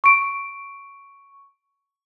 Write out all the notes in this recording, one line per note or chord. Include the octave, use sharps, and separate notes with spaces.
C#6 D7